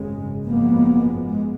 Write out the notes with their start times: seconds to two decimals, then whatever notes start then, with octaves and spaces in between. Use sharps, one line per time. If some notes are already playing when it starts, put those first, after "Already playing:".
Already playing: G#1 F#2 C#3 G#3
0.45 G#1 F#2 F3 G#3 A#3 B3
1.27 G#3